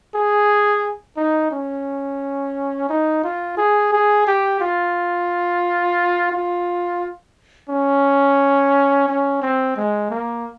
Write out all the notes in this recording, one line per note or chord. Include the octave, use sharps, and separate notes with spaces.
G#4
D#4
C#4
D#4
F4
G#4
G#4
G4
F4
F4
C#4
C#4
C4
G#3
A#3